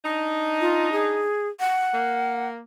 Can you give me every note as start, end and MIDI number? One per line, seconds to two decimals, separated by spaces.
0.05 1.30 62
0.05 1.30 63
0.61 0.92 65
0.92 1.48 68
1.60 2.47 78
1.94 2.61 58